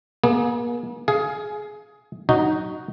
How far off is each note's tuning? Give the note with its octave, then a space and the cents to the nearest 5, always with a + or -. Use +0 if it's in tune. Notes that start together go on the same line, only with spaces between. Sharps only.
A#3 +45 G#4 +20
G#4 +15 F5 +0
F#3 +0 D#4 +0 F#4 +0